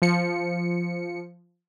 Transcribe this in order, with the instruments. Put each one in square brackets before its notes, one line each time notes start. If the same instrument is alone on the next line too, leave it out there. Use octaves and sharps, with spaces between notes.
[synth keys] F3 C#7